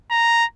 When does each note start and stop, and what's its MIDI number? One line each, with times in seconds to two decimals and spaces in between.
0.11 0.45 82